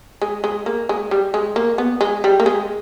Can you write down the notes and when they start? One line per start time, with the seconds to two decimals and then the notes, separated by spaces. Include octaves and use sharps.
0.22 G#3
0.44 G#3
0.66 A#3
0.89 G#3
1.11 G3
1.34 G#3
1.56 A#3
1.78 B3
2.01 G#3
2.24 G3
2.40 A#3
2.46 G#3